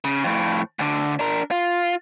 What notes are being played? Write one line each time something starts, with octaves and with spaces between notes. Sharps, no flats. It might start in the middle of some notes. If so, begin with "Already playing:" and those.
C#3
F2 A2
D2 D3
D4 A#4
F4